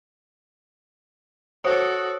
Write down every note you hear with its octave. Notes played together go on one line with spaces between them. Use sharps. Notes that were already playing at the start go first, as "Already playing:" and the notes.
F#4 A4 C5 C#5 D#6